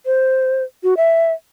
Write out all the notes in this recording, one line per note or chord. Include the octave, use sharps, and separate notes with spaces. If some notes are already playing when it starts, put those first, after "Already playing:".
C5
F#4
E5